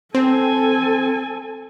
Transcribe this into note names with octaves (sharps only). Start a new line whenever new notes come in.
C4 A4 G#5